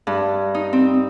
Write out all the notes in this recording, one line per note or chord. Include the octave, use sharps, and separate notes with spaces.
G2
D#4
C4